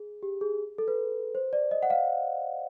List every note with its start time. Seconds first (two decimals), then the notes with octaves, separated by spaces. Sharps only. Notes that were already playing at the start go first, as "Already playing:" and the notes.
Already playing: G#4
0.23 G4
0.41 G#4
0.78 A4
0.88 B4
1.35 C5
1.53 D5
1.71 D#5
1.83 F#5
1.90 F5